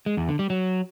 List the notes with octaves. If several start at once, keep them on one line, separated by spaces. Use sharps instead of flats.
G#3
E2
D3
G3
F#3